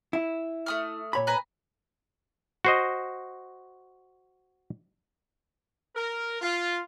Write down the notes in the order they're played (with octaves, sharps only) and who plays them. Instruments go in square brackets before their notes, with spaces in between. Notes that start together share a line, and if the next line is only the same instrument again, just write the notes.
[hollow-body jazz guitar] E4
[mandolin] A3 D#6 F6
[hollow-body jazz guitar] A#2 C#5 B5
[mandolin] B4 G#5 A#5
[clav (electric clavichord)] F#4 C5 D#5
[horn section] A#4
F4